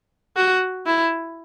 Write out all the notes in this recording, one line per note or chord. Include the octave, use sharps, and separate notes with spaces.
F#4
E4